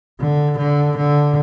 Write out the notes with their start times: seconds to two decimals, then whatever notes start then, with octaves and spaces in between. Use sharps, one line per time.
0.20 D3
0.58 D3
0.97 D3